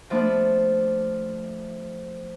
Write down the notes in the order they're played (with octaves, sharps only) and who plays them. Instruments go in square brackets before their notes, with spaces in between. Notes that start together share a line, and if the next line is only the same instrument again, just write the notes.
[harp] F3 A3 B3 D4